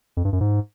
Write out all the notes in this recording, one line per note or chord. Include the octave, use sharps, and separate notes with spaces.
F2
G2
F#2
G#2